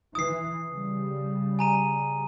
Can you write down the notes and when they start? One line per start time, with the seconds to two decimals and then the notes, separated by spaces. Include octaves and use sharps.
0.15 E3 D#6 C7
0.69 C#3 G3
1.59 G#5 A#5 D#7